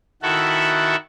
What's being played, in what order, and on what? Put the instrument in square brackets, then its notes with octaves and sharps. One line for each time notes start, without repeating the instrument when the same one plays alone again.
[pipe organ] D#3 E4 F#4 A4 E5 F#5